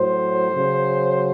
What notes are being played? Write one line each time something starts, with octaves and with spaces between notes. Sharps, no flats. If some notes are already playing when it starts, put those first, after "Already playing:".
Already playing: A2 F#3 C5
C#3 F#3